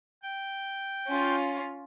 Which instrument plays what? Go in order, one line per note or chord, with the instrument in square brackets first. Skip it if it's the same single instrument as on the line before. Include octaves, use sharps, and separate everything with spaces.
[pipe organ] G5
[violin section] C#4 F4